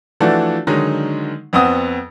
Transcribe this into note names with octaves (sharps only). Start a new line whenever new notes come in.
E3 F3 A3 D4 F#4 A4
D3 D#3 F#3 G#3 D#4
F2 B3 C4 F#5 D#6